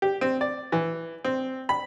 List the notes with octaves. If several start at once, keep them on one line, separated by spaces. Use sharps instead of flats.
G4
C4
D5
E3
C4
B5